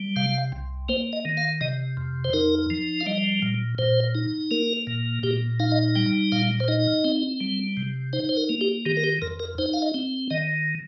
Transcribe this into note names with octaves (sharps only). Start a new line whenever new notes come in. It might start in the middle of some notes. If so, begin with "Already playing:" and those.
Already playing: G3
C3 F5
C2
A#3 C5
D#5
D#3
F5
C3 D#5
F2
C5
D#4 A#4
F3
F5
G3 D#5
A#2
A#2 C5
D#4
A#3 A#4
A#2
A#2 G4
D#4 F5
D#5
G3 G5
A#2 F5
C5
D#4 D#5
C4
G3
C3
D#4 C5
C5
A#4
A#3
G4
D#3 G4
A#4
G4
F2 A#4
A#4
D#4 C5
F5
D#5
C4
D#3 D#5